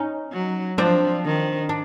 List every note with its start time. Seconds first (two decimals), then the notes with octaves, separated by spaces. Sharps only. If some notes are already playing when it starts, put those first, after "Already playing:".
Already playing: C#4 D#4
0.32 F#3
0.78 F3 C4 D4
1.24 D#3
1.69 D4